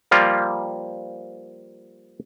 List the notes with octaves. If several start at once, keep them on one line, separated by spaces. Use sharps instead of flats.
F3 G3 A#3 F4